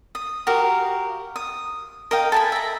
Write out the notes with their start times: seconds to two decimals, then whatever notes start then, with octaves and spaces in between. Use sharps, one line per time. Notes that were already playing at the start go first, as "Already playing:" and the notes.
0.15 D#6
0.47 F#4 G4 A#4 F5
1.36 D#6
2.11 A#4 D#5 F5 G5
2.32 A4 G#5 B5
2.52 E5 A#5